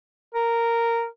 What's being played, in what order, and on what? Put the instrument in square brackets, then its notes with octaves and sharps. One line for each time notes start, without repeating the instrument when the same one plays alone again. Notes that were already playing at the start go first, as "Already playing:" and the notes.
[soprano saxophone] A#4